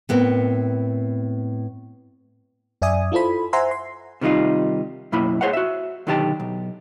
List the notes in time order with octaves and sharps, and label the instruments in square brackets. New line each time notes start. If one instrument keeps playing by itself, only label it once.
[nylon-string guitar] A2 B3 C4 A#4
[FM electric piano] F#2 D5 E5 G#5 D#6
E4 F4 A4 C5 B5
C5 E5 F#5 G#5 A#5 C6
C6
[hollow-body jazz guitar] C3 D#3 G3 D#4 F4
F#2 B2 A#3 E4 B5
G#4 C5 C#5 F5 F#5
F#4 E5
B1 D3 D#3 G4 C5 A5
B1